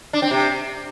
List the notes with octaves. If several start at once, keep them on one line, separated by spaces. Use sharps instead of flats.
D4
C4
C3